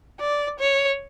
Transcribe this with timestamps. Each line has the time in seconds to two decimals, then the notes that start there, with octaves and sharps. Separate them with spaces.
0.20 D5
0.59 C#5